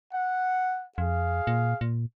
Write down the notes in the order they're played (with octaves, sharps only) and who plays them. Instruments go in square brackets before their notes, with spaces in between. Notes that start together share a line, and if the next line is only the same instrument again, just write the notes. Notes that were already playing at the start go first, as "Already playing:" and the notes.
[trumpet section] F#5
[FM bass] F2 [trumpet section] G#4 F5
[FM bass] A#2
A#2